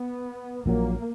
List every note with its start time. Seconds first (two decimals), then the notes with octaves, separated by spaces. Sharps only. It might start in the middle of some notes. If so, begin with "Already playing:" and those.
Already playing: B3
0.66 A#1 A#2 F#3 A#3